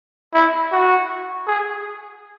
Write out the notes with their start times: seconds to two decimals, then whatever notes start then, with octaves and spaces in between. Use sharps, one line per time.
0.34 E4
0.72 F#4
1.47 G#4